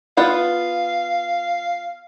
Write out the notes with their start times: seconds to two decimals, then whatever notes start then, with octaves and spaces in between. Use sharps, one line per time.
0.17 B3 F4 F5 F#5